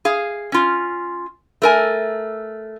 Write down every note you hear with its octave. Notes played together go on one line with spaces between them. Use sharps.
G#4 F5
C#4 F4
A3 A#4 G#5